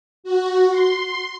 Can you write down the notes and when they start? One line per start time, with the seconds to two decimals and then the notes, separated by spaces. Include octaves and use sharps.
0.24 F#4
0.71 C6